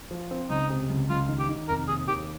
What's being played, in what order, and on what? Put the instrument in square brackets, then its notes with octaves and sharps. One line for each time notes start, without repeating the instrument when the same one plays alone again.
[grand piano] F3
C4
[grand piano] C#2 [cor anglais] D#4
[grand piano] C3
C#2
[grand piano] C#2 [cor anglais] F4
[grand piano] D#3
[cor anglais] G4
[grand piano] D#3
[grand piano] F1 [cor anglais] A#4
[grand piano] D#2 [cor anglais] G#4
[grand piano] D#2 [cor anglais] G4